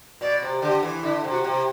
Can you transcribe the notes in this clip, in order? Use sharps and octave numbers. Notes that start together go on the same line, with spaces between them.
B2 D5
C3
D3 G4
E3
D3 E4
C3
F#4
C3